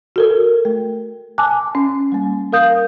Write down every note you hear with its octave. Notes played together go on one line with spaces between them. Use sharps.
F#4 A4 A#4
A3
G#5 A5 D6 E6 F#6
C#4
G3 A#3
A#4 F5 D#6 G6